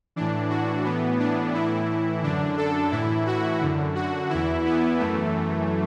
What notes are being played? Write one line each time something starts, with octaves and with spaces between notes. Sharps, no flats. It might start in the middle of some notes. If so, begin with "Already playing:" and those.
A2 E3 D4
F#4
A2 E3 B3
D4
A2 E3 E4
F#2 D3 D4
A4
A2 E3 E4
F#4
F#2 D3
F#4
E2 E3 E4
B3
F#2 E3 A3